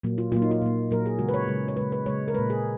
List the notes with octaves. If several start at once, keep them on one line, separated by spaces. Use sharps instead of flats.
A#2 F#3 A#3
F4
A#2 F#3 A#3 F4
D#4
F4
A#2 F#3 A#3
A#2 F#3 A#3 A#4
G#4
C#3 G#3 F#4
B4
C#5
C#3 G#3
C#5
C#3 G#3 B4
B4
C#3 G#3 C#5
A#4
A#2 G#3 B4
G#4